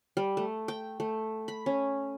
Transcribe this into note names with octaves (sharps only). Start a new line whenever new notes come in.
G3
A3
G5
A3
B5
C#4